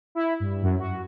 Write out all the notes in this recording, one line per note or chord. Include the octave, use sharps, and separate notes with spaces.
E4
G2
F#2
F#4